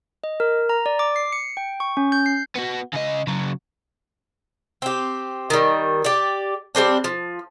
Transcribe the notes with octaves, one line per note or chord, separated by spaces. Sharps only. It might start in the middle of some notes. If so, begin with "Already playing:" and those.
D#5
A#4
A#5
D5
D6
C7
C#7
G5
C#6
C#4
G6
C7
B3 F#4
C#3 D#5
C#3 F#3
C4 G4
D#3 G3
G4 D5
G3 A#3 C4 D4
F3